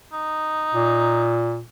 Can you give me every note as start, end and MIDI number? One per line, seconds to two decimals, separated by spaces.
0.13 1.43 63
0.73 1.61 46